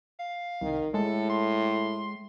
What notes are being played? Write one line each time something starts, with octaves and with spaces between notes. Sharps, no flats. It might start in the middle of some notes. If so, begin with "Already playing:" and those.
F5
C2 D#3
A2 G#3 A4
C6